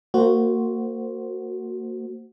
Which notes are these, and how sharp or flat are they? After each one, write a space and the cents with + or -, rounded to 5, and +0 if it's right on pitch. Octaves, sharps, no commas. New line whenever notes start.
A#3 -25 F#4 +0 C5 +0